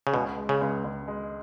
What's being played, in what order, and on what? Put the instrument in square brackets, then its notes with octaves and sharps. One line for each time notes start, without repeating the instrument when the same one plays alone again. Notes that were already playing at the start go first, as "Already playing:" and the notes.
[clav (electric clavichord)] C#3
[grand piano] C#2 [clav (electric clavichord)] B2
[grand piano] G#3
[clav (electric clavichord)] C#3
[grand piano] C#2
C#2
G#3